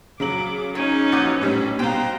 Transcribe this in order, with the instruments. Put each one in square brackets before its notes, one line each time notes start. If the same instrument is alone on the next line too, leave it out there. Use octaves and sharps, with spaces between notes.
[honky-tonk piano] C#3 F#3 F#7 [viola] D6
[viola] C#4 D#4 [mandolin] C#5
[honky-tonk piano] A#1 F#4 D6 [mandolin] B4 D#5 G6
[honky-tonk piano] A2 G3 C#4
[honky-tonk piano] B2 [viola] C5 A#5 [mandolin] F5 G5